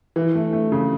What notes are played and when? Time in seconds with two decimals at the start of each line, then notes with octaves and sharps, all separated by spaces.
0.16 E3
0.35 A3
0.53 A3
0.72 C#3